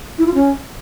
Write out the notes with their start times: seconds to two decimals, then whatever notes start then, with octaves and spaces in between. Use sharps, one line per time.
0.18 E4
0.26 F4
0.34 C#4